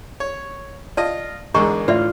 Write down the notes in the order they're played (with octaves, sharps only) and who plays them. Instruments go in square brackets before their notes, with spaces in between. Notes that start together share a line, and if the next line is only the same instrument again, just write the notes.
[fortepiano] C#5
[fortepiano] F4 D#5 [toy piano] D5 A5
[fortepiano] E2 G#2 D3 [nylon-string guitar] G#3 A#4 [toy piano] D#5 A#5 C#6
[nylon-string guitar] A2 [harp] F4 [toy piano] B4 D5 E5